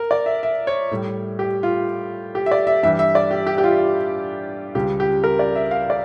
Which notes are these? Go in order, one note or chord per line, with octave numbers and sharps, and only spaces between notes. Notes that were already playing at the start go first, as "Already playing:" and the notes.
Already playing: A#4
D5
E5
E5
C#5
A2 G3
G4
F4
G4
E5
D5
E5
G2 E3 G3 E5
E5
D5
G4
G4
G4
F4
C#2 C#3 G3 G4
G4
A#4
D5
E5
F5
D5